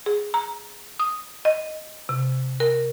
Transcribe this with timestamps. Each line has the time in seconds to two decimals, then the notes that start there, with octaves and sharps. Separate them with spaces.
0.06 G#4
0.34 A#5
0.99 D#6
1.45 D#5
2.09 C3
2.60 A#4